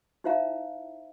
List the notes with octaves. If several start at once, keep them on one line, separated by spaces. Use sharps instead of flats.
D#4 E4 C5 E5 F5 A#5